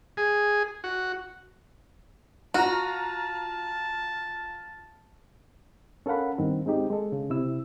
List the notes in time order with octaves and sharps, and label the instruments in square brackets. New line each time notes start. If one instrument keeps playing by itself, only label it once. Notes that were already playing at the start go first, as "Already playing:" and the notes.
[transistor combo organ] G#4
F#4
[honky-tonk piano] F4 A#5 [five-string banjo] F#4 [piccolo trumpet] A5
[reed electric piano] C#4 A4 A#4 F5 F#5 B5
G2 D#3 C4
G#3 C4 D#4 G4
G#3 A4
C#3
C3 E4 E6